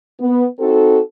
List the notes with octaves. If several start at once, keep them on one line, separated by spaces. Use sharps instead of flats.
B3
C4 D#4 F#4 A4